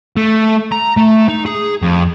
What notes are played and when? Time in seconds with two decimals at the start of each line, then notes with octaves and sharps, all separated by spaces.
0.17 A3
0.72 A#5
0.97 A3
1.28 D#4
1.46 G#4
1.82 F2